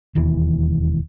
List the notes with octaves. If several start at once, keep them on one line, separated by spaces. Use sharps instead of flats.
E1 D#2 E3